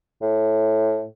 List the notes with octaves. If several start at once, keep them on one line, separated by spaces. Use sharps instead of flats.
A2